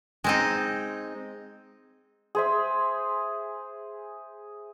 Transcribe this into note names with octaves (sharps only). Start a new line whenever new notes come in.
G#3 C4 D#4
G#4 C5 E5